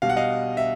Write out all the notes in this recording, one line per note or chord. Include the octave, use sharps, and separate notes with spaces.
B2 G3 F5
F#5
D#5 F5
E5